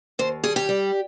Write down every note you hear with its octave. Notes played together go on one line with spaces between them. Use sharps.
D#2 C5
G3 G#4
G4
G3